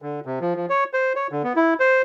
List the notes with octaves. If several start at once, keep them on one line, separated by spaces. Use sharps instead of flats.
D3
C3
F3
F3
C#5
C5
C#5
D3
B3
E4
C5